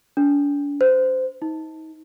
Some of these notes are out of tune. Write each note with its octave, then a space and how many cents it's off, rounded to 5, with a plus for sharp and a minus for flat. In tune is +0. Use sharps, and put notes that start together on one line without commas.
D4 -40
C5 -20
D#4 +30